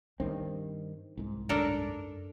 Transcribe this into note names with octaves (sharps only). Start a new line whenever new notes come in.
G2 D#3 C4 D4
C2 G#2
F#2 D4 A4 A#4